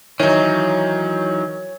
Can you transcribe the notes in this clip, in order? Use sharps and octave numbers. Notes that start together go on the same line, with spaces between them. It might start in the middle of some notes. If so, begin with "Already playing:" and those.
D#3 E3 F#3 D#4 C#5